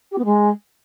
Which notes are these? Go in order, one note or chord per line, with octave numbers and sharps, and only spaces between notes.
G4
B3
G#3